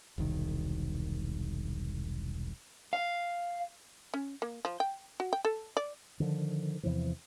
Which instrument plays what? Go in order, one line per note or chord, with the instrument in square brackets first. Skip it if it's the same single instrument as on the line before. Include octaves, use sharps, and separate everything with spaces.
[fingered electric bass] E1 C2 D#3
[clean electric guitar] F5
[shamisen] C#4
A#3
F3
G5
F#4
G5
A4
D5
[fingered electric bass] D3 D#3 F3
E2 C3 E3 F3